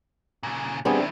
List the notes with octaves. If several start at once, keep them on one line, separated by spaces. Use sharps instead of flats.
A#2 C#3
D#3 G3 B3 C4 D4 E4 G#4